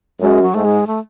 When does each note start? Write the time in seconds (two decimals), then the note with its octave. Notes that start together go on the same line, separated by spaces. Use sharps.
0.20 F#2 G#3
0.43 F#3
0.54 G#2 A3
0.65 G#3
0.87 A3